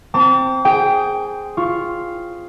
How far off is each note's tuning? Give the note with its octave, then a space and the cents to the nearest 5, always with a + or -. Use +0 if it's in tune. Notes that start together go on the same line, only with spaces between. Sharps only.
C4 +0 A5 +35 D6 -40
G#4 +0 G5 +0
F4 +0 C#6 +0